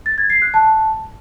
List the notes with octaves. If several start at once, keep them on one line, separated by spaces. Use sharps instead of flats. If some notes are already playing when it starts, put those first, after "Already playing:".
A6
G#6
C7
F#6
A5